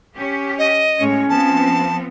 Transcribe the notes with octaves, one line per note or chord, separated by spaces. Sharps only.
C#4 G4
D#5
A2 G#3 C#4 C#5
F3 B3 C4 A5